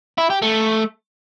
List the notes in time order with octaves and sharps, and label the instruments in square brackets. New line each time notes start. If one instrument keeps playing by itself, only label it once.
[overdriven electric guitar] E4
G4
A3